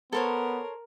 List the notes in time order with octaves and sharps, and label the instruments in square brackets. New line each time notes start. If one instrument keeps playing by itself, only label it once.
[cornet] B3 [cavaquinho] A4 C5 C#5 [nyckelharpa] A#4